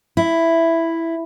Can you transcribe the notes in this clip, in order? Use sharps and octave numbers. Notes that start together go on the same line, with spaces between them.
E4